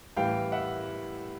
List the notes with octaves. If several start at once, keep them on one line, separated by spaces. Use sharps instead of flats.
A2 E3 G3 F5 G5
E5 F#5